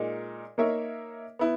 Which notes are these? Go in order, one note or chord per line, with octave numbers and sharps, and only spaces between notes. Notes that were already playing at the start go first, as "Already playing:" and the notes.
Already playing: A#2 G#3 D#4 A#4
A#3 D#4 A#4 C#5 E5
B3 E4